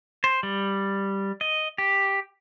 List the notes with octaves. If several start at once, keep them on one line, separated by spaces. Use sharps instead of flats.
C5
G3
D#5
G4